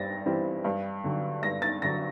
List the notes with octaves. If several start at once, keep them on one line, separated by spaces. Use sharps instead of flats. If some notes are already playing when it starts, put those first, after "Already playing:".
Already playing: G2 G3 C4 A6 A#6
E3 G3 C4
G2
D3 F#3
G2 A#6
A6
D3 F#3 A#6